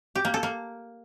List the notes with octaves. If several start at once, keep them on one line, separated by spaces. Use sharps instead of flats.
G4
A#3
A4
A#3